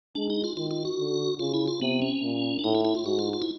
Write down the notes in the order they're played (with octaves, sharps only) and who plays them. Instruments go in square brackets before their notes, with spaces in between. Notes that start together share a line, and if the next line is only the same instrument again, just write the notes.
[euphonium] G#3 [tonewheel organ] D4
[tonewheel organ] D#4
F4
[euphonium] D#3 [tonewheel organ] F4
[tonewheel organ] F4
F#4
[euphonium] D3
[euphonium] C#3 [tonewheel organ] F4
[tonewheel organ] E4
F4
[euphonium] C3 [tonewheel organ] B3
[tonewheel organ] C#4
[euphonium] A#2
[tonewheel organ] D4
[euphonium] A2 [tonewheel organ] D#4
[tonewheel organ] E4
E4
F4
[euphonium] G#2 [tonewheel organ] F#4
[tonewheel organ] F4
F4
E4